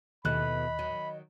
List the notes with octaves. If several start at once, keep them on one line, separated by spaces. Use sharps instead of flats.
D#2 B2 E3 A3 D#5 B5 F#6
D#3 F#3